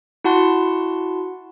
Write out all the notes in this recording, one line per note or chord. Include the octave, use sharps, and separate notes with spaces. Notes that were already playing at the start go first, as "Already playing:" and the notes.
E4 F#4 F#5 A5 C6